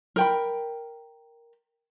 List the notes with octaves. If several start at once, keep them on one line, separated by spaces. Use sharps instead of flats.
A#4 G5 B5